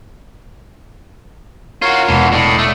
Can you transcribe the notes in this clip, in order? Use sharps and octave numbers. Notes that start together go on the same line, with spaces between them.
F4 F#4 A#4 C#5 F5
E1 B2 E3
A2 D5 D#5
A3